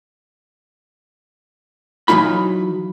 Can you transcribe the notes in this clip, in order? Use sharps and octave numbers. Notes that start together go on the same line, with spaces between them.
E3 F#3 D#4 F4 B5